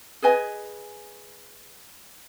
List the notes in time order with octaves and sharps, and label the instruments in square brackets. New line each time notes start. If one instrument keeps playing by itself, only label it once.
[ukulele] G#4 B4 D#5 G#5